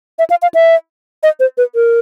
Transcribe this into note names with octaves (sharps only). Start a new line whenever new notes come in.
E5
F5
F5
E5
D#5
C5
B4
A#4